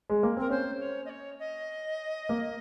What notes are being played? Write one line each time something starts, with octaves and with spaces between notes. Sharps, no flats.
G#3
A#3
C4 A#4
C#4 C5
C#5
D#5
C#5
D#5
A#3